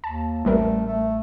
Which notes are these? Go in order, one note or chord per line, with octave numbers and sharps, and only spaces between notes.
D#2 A5
A1 G3 A3 A#4
A3